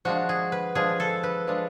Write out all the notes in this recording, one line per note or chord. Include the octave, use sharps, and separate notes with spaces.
F3 G#3 D4 F#4
G#4
B4
F3 G#3 D4 G#4
A4
B4
F3 G#3 D4